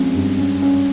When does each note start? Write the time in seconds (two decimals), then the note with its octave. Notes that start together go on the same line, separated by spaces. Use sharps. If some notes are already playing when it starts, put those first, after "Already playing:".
Already playing: F3 G#3 C4 C#4
0.14 G2
0.38 C#4
0.62 C#4